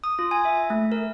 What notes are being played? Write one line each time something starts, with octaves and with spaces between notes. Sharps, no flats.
D#6
F4
G#5
E5
A3
A#4